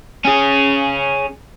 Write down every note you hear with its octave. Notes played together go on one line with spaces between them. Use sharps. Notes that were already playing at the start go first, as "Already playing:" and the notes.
C#4 G#4